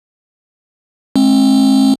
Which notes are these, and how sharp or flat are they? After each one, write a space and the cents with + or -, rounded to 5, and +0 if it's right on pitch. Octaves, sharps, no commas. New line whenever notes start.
G#3 +35 C4 +40